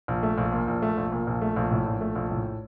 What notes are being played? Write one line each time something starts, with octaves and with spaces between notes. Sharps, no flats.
A#1
A3
A#1
A#2
A#1
A3
A#1
A#2
A#1
A3
A#1
A2
A#1
A3
A#1
A2